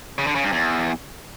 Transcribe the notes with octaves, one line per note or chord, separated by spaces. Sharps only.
C#3
D3
C#3
G2
E2